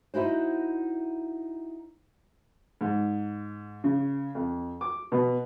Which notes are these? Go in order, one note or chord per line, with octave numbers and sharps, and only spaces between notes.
D#4 E4 F#4 C5
G#2
C#3
F2
D6
B2